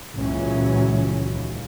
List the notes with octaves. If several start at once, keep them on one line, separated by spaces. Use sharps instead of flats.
C#2 A#2 E3 F#3 G#3 C#4
D#2